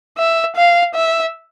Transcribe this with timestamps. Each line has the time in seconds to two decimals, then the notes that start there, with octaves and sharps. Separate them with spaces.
0.18 E5
0.56 F5
0.95 E5